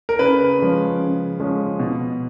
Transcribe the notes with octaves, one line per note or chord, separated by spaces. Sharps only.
A#4
C#3 B4
F3 G#3 C#4
C#3
F3 G#3 C#4
B2